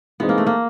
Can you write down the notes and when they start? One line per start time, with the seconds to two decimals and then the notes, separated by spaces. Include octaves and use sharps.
0.20 E3 G#3 B3 C4 D#4
0.29 A#3
0.38 A3
0.47 A#3